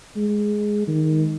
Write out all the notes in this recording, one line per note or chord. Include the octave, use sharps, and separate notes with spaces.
G#3
D#3